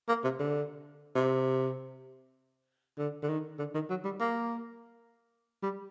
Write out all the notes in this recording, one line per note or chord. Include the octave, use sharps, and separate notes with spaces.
A#3
C3
D3
C3
D3
D3
D#3
D3
D#3
F#3
G3
A#3
G3